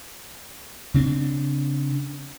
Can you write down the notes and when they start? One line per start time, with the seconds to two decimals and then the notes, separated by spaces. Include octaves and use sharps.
0.94 C#3 C4 D4